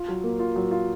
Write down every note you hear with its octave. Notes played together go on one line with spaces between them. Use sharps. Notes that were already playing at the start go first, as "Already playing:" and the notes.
Already playing: F4
F#3
A#3
F4
F#3
F4